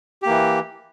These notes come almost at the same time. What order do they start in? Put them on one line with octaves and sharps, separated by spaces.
G4 A#3 E3